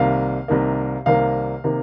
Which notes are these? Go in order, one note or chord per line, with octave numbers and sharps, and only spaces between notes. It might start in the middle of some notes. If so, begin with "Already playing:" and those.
Already playing: C2 C3 D#3 A#3 F5
C2 C3 D#3 A#3
C2 C3 D#3 A#3 F5
C3 D#3 A#3